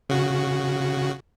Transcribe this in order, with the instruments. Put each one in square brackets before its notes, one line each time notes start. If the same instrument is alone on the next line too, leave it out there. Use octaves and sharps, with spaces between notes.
[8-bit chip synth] C#3 F#4